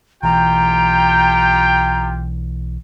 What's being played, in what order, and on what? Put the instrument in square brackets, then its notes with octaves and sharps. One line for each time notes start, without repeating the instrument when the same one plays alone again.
[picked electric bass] B1 E3 [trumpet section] F4 G4 G5 [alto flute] A#5